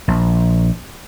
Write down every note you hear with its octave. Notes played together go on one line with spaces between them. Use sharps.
A#1